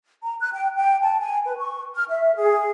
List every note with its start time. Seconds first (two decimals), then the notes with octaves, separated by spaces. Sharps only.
0.22 A#5
0.40 F#6
0.53 G5
0.76 G5
1.01 A5
1.20 G#5
1.46 B4
1.57 C#6
1.95 F6
2.10 E5
2.35 G#4